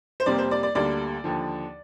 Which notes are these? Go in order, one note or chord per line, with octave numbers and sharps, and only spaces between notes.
C5
F2 C3 G3 A#3 D5
C5
D5
D5
D2 D3 G3 A#3 D5
D#2 D3 F3